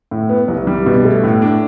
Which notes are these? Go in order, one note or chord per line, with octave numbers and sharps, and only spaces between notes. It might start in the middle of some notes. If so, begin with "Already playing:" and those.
A2
B3
C2
G3
B2
A3
A2
D4